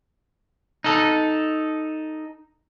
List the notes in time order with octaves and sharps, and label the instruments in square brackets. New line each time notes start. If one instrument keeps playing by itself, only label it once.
[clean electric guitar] D#4 A4